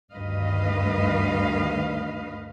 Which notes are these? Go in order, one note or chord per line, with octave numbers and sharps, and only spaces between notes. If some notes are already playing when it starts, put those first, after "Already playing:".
D2 G2 D#3 B4 D#5 F5